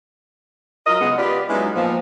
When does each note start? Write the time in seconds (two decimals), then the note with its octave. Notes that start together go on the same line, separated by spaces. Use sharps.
0.87 F#3 F4 A#4 D#5
1.01 C#3 G#3 B3
1.18 B3 F4 G4 B4 D5
1.49 F#3 G#3 B3 C#4 D#4 E4
1.76 A#2 F3 B3